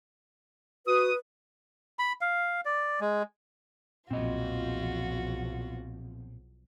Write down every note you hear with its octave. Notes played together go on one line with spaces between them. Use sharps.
F#4 B4 D#6
B5
F5
D5
G#3
B1 E2 A#2 F3 C4 F4 F#4 D#5